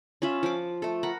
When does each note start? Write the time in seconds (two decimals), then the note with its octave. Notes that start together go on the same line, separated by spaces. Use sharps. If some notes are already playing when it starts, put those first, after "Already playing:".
0.22 C#4 F4 E5 B5
0.43 F3 D6
0.82 A3 A4
1.03 A#4 F#5 B5